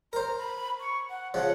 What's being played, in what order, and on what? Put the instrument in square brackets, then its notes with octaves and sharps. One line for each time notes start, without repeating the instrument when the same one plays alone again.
[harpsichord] A#4 C5 [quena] A#5
[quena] B5
C#6
F#5
[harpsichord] C#3 F3 [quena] F#5